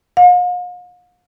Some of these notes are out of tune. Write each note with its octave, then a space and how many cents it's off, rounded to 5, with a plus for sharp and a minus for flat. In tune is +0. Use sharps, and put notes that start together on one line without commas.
F5 +45